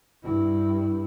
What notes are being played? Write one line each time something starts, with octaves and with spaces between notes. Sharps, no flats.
G2 E4